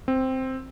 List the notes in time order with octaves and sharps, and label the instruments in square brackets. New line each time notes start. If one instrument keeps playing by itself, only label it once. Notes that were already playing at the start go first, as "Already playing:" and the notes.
[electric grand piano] C4